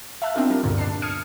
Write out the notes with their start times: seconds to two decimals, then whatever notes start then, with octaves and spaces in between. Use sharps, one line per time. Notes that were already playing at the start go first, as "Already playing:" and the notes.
0.22 E5 F5 A5 F6 F#6
0.35 B3 C4 D4 D#4 F4 A#4
0.50 G3 D4 A#4
0.63 D2 G2 A#2 D3
0.78 D4 A5 C7
1.02 D#6 F6 G#6 C#7 D#7